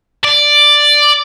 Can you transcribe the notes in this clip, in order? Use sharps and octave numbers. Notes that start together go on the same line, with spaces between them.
D5